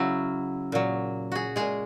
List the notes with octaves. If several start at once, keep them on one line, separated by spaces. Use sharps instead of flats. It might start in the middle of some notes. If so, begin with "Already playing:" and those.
Already playing: C#3 F#3 C#4 E4
A#2 F#3
F#4 G#4
A#2 G#3 G#4